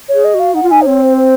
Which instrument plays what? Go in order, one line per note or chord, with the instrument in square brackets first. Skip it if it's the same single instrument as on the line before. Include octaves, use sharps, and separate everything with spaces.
[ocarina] C#5
[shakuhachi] G#4
[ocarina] D#5
[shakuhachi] F#4 [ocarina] F5
[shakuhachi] D#4 [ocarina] F#5
[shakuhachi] F4
[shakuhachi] D#4 [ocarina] G#5
[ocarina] C5
[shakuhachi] C4 [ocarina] C#5
[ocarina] C5
C5